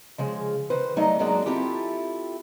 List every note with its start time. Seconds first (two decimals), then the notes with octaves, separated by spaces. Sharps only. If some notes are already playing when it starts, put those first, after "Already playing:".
0.18 C#3 F3 G#3
0.70 D#3 B4 C5
0.96 F#3 G3 A3 D#4 D#5
1.19 F#2 F#3 G#3 A#3 D4
1.45 C4 E4 F4 G4 A4